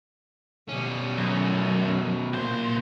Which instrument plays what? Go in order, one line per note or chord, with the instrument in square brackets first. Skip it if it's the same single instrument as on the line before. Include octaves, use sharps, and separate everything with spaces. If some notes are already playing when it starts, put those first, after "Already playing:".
[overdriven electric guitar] B2 C#4 [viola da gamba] G3
[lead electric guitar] F#2 [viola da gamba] A3
[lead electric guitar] C2 C5 [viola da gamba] A#2